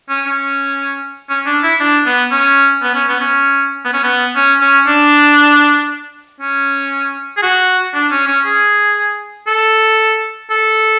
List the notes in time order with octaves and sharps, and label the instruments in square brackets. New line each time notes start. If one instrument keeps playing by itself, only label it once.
[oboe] C#4
C#4
C#4
D4
E4
D4
B3
C#4
B3
C#4
B3
C#4
B3
C#4
B3
C#4
C#4
D4
C#4
G#4
F#4
D4
C#4
C#4
G#4
A4
A4